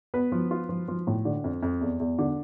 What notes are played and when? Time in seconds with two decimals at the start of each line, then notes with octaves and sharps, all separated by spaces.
0.14 B3 B4
0.32 F3
0.51 F4
0.69 F3
0.88 F3
1.07 A2
1.25 D3
1.44 F2
1.63 F2
1.81 E2
2.00 E2
2.19 D3